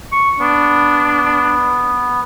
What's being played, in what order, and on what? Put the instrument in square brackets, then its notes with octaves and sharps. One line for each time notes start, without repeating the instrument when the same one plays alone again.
[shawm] C#6
[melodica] B3 [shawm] D4